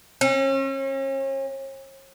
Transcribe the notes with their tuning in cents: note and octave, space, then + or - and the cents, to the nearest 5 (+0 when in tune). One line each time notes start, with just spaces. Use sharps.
C#4 -40